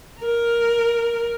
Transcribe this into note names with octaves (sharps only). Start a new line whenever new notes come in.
A#4